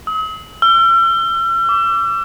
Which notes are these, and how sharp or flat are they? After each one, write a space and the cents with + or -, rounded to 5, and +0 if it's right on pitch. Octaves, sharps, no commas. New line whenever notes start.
D#6 +45
E6 +45
D6 -35